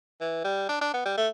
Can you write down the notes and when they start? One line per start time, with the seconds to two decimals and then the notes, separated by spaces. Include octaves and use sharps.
0.21 E3
0.44 G3
0.69 D4
0.81 D4
0.93 B3
1.05 G3
1.17 A3